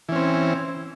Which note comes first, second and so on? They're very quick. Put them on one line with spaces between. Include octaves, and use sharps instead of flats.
E3 C#4 C4